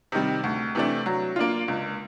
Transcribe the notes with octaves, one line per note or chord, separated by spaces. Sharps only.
C3 D#3 G3
D2
C3 E3 A3 D4
F#3
A#3 D4 F4
C#2